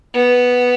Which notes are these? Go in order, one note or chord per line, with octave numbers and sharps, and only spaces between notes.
B3